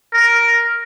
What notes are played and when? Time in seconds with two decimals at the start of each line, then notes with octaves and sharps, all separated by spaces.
0.14 A#4